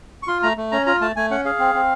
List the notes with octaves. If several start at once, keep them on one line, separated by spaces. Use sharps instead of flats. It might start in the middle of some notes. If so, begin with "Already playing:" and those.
C#6
F4 C6
A3 A#5
A3
C#4 A#5
F4 A#5
A3 A5
A3 G#5
C#4 F#5
G#4 F5
C4
C4